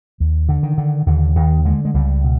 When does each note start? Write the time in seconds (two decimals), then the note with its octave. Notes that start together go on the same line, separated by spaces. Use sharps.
0.20 D#2
0.49 D3
0.63 D#3
0.78 D3
1.06 D#2 D3
1.36 D#2 D#3
1.65 D3 G#3
1.85 G#3
1.94 C#2 G3
2.24 B2